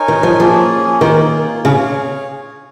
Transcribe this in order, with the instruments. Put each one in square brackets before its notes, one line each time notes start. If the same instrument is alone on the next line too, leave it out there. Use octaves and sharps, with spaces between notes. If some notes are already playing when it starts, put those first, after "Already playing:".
Already playing: [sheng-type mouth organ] D#4 A#4 C#5 G#5
[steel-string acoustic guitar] D#3
F3
[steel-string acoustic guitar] F3 [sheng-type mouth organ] A#3 C#4 G#4
[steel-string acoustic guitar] D#3 [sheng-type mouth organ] A#3 F4 G#4
[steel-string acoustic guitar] C#3 [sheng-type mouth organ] G#4 C#5 F5